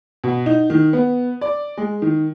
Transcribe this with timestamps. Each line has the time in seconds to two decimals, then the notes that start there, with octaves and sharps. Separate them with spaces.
0.24 B2
0.46 D#4
0.70 D#3
0.93 B3
1.41 D5
1.77 G#3
2.02 D#3